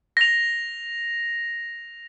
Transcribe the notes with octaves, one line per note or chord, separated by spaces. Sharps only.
A#6 F7